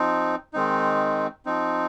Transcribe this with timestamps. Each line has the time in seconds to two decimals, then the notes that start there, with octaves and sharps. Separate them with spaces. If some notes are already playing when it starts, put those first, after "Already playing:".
Already playing: F3 C4 D#4
0.54 D#3 G#3 C4 D#4
1.46 F3 C4 D#4